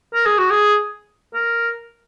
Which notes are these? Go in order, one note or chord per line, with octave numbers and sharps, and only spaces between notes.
A#4
G#4
F#4
G#4
A#4